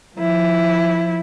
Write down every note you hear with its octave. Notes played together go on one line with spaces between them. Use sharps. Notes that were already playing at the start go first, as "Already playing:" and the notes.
F3 E4